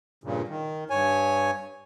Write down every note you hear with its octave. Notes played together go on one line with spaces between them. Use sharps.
G2 A#2 C#3
D#3
G2 C#5 G#5